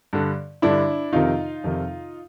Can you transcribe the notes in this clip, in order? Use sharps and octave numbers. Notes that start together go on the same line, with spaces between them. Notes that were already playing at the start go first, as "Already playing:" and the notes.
G2 D3
G2 D3 D4 E4
F2 C3 D#3 D#4 F4
F2 C3 D#3